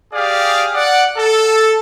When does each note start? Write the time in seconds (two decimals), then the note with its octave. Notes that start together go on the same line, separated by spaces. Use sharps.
0.13 G4 G#4 D5 F5
0.75 D5 F#5
1.17 A4